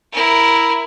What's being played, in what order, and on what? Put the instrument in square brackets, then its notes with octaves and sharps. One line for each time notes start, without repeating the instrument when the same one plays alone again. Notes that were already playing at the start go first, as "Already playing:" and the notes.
[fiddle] E4 A#4